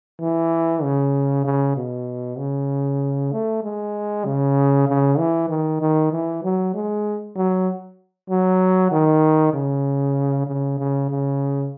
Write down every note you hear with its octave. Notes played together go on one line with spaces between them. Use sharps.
E3
C#3
C#3
B2
C#3
A3
G#3
C#3
C#3
E3
D#3
D#3
E3
F#3
G#3
F#3
F#3
D#3
C#3
C#3
C#3
C#3